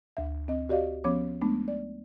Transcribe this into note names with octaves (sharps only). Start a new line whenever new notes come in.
D2 E5
C4 D#5
F#4 G4 D5 D#5 F5
F3 B3 C#4 C#5 D6
G#3 A3 B3 D4
D5